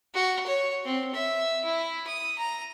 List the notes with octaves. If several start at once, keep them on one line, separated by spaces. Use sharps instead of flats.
F#4
C#5
C4
E5
E4
D#6
A#5